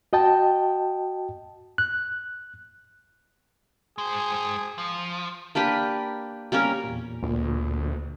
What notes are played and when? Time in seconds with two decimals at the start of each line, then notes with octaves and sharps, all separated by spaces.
0.13 F#4 D#5 G5 A5
1.78 F#6
3.98 G#3 G#4 C5
4.78 F3
5.55 A#3 D4 G4 B4
6.52 G3 A#3 C#4 A#4
6.84 E2 A#2
7.23 D2 A#2